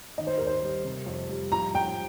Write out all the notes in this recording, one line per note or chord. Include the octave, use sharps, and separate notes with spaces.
D#3 D#5
C5
D#2 A#4
C5
G3
C3
F2
G3
F3 A#5
F3 G5